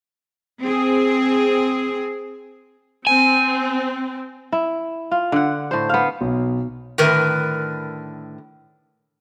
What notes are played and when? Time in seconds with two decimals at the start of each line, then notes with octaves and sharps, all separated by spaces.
0.61 C4 G#4
3.07 C4 G#5
4.52 E4
5.11 F4
5.32 D3 F#5
5.71 A2 C5
5.89 B3 F5
6.21 B1
6.98 A2 D3 D#3 A#4 B4